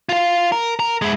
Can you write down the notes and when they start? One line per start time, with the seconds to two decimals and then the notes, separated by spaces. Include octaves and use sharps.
0.09 F4 F5
0.52 A#4
0.79 A#4
1.02 G#3 E4